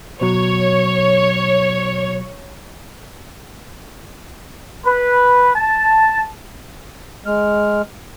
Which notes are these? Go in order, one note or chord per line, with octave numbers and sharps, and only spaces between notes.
B2 F#3 C#5
B4
A5
G#3 F6